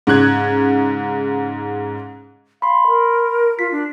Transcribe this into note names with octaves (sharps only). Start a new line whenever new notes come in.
G#2 C#3 F#6 G#6
F5 B5 C6
A#4
F4 B6
D4